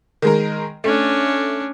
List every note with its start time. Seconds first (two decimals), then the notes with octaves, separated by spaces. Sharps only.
0.22 D#3 G#3 A#4
0.84 A3 C#4 D4